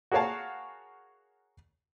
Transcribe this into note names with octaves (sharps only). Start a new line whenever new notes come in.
F#4 G#4 A#4 C#5 F5 A5